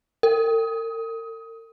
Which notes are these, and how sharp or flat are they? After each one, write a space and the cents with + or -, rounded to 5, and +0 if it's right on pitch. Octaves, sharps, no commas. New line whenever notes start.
A#4 -45